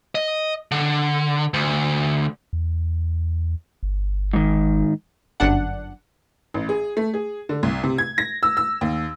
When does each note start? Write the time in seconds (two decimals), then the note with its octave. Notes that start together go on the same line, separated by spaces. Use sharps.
0.15 D#5
0.72 D3
1.54 D2
2.53 E2
3.83 G1
4.33 G#2 D#3
5.40 G1 F#2 D4 F#5
6.54 A1
6.69 G#4
6.97 A3
7.14 G#4
7.49 D3
7.63 C2
7.84 C3
7.98 G#6
8.18 A#6
8.43 E6
8.57 E6
8.81 D#2